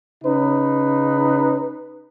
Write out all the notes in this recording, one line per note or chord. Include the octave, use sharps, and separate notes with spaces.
C#3 C#4 D#4 B4